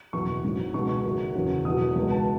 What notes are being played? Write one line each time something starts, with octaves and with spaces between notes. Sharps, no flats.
F#1 E2 B2 C#6
A1 G#2 F#3
C#2 B2 G#3 C#6
C#6
F#1 F#2 D#3 F#3
F#1 E2 C#3 F#3
E1 E2 B2 F#3 D#6
C#2 B2 G#3
A5